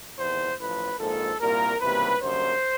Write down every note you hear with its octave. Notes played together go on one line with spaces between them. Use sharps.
E2 C3 D#3 C5
A1 A2 F3 B4
A#1 G#2 F3 A#3 A4
C2 A#2 G3 A#3 A#4
C#2 C3 E3 G3 A#3 B4
F#2 D3 G3 A#3 C5